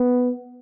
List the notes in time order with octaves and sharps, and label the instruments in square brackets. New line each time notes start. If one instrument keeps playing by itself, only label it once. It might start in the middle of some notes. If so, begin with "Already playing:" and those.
Already playing: [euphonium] B3